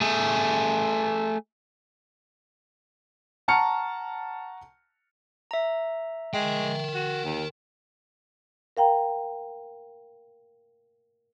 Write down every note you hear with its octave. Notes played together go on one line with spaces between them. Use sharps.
A3 G#4
F#5 A5 A#5 C#6 F6 C#7
E5 A#5
G#3 A#4 G5
F#4
D#2
A#4 F5 G5 A#5